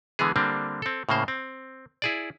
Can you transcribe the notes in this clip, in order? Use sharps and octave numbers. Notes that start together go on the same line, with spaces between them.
D3 E3 G#3 B3 G#4
D3 G3 A#3 C4 D4
C4 A4
A2 C#3 A#3 C5
C4
E4 G#4 D5